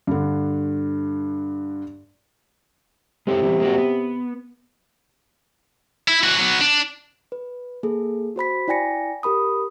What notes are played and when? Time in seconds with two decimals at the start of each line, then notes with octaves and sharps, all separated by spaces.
0.07 G2 D3
3.27 C3 G#3 A4 C#5
3.42 E3 G3 B3
3.60 G#3 A#3 F#4
3.78 B3
6.08 E4
6.24 E3 F#4
6.39 F#3 B3
6.61 D4
7.32 B4
7.83 A#3 G#4 A4
8.36 F#4 C5 B5 B6
8.68 E4 D5 G5 G#5 A#6 C#7
9.23 G4 A#4 B5 D#6